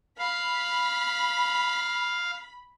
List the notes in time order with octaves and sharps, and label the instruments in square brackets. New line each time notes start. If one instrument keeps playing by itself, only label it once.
[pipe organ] F5 [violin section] B5